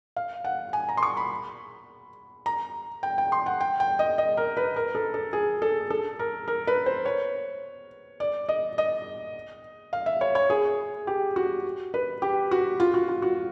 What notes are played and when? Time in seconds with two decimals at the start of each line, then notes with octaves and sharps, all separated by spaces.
0.16 F5
0.45 F#5
0.73 G#5
0.89 A#5
0.97 C6
1.03 C#6
1.17 B5
2.46 A#5
3.03 G5
3.18 G5
3.32 C6
3.46 F#5
3.61 G5
3.80 G5
3.99 D#5
4.18 D#5
4.37 A#4
4.57 B4
4.76 A#4
4.95 A4
5.14 A4
5.33 G#4
5.62 A4
5.90 A4
6.19 A#4
6.48 A#4
6.67 B4
6.86 C5
7.05 C#5
8.20 D5
8.49 D#5
8.78 D#5
9.93 F5
10.06 E5
10.21 C#5
10.35 C#5
10.50 G#4
11.07 G4
11.36 F#4
11.94 B4
12.22 G4
12.51 F#4
12.80 F4
12.94 F#4
13.08 F4
13.22 F#4